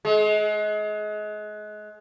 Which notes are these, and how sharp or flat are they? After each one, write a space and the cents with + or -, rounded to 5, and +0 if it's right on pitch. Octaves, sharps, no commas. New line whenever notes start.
G#3 +30